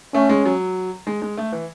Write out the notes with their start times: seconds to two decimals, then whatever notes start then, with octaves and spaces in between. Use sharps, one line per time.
0.14 A3 C#4
0.29 G#3
0.45 F#3
1.07 G#3
1.22 G#3
1.37 A3
1.52 E3